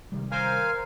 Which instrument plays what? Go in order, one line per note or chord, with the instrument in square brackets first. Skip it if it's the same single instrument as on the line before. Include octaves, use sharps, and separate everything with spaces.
[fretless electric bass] C3 D#3 G3
[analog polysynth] A#4 C5 [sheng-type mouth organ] F5 G#5